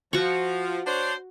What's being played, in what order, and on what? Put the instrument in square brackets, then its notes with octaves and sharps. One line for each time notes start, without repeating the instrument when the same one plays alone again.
[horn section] F3 [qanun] F#4 C#6
[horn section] D4 C5 C#5